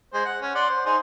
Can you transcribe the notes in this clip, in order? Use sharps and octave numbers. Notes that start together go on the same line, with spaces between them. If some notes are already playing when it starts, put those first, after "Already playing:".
G#3 C5
F#5
C#4
D5 F#5 C6
C5
D#4 G#4 C5